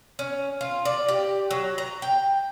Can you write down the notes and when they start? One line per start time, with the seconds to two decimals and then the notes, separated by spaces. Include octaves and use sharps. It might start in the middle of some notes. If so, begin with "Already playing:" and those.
0.19 C#4
0.61 F4
0.85 D5
1.08 G4
1.51 F#3
1.78 A#5
2.02 G5